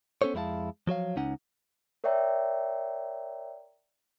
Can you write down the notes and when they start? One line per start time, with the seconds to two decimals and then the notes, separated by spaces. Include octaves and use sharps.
0.22 B3 C#4 A4 C5 C#5
0.34 F2 G#3 E4 G4 F5 A5
0.87 F3 F#3 C#5 F5
1.16 C#2 C#4 D#4 F#5
2.04 A#4 C#5 D5 E5 G5 A#5